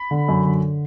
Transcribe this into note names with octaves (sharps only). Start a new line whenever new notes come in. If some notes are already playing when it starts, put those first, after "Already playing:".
Already playing: B5
D3
F#2
D3